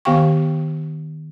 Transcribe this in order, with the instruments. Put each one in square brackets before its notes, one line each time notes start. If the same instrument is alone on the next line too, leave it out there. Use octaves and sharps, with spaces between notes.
[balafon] D#3 B3 G4 F5 G5 C#6